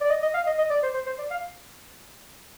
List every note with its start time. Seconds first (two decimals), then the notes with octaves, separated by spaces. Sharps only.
0.01 D5
0.09 D#5
0.22 D#5
0.34 F5
0.46 D#5
0.58 D#5
0.70 D5
0.83 C5
0.94 C5
1.06 C5
1.18 D5
1.30 F5